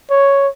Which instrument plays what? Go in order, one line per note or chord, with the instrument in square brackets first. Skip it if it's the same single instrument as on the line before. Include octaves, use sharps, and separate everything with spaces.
[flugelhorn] C#5